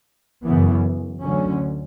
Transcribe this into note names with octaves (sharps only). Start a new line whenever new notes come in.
F#2 C#3 E3 B3
D2 D3 F#3 C#4